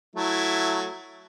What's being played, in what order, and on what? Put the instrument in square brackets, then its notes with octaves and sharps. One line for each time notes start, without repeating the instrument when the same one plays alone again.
[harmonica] F#3 A3 E4